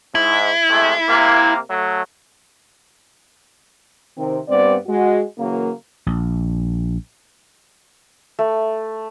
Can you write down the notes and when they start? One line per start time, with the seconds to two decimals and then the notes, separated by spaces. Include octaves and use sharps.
0.15 G#2 E4
0.70 C3 G#3 A3
1.08 C3 A#3
1.71 F#3 A3
4.17 C3 D#3 C4
4.48 G2 G3 B3 C4 D5
4.87 G#3 F#4
5.37 C#3 E3 F#3 A#3
6.06 A#1
8.39 A3